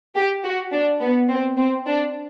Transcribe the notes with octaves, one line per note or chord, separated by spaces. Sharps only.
G4
F#4
D4
B3
C4
C4
D4